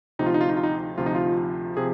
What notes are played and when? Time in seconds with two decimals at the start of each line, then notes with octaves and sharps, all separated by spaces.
0.19 D2 C3 F3 D#4
0.26 F4
0.34 D#4
0.41 F4
0.49 D#4
0.57 F4
0.63 D#4
0.98 D2 C3 F3 F4
1.06 D#4
1.15 F4
1.77 C3 F3 G#4